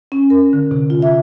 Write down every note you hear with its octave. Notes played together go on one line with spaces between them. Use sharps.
C#4
A#4
D3
C3
F4
E5